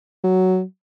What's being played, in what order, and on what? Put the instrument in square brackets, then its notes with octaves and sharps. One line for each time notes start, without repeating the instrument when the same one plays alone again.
[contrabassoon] F#3